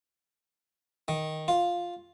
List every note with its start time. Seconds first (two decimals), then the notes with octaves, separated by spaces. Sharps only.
1.08 D#3
1.48 F4